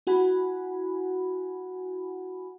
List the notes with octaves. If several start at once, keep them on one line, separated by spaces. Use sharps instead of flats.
E4 F#4 F#5 G#5 B5